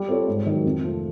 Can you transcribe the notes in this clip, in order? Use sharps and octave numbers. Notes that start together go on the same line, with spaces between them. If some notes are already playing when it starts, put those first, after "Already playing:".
Already playing: G3
C4 F4 A4 C#5
G#2
D#3 F#3
F2
C3 F3 A3